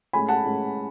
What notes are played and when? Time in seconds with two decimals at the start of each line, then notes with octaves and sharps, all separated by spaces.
0.13 A2 G#3 C#4 G#5 B5
0.28 F#5 A5
0.44 A2 G#3 C#4